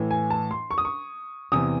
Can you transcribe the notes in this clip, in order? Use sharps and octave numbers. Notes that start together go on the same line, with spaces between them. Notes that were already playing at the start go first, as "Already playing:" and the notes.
Already playing: A2 E3
G#5
A5
C6
C#6
D#6
C#6
E2 C3 E3 D#6